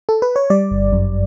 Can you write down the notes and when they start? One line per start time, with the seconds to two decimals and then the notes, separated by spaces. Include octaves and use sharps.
0.09 A4
0.22 B4
0.36 C#5
0.50 G3 D5
0.71 G1
0.93 F#2